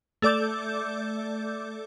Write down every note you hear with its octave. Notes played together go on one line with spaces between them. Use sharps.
A3 A4 D5 D6 G6